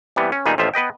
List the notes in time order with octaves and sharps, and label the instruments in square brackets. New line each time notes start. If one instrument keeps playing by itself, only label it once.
[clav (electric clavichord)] C3 E3 G3 B3
C#4
A#2 D#3 G3 B3 D#4 G#4
A1 F2 F3 F4 E5
B3 B4 D#5 G5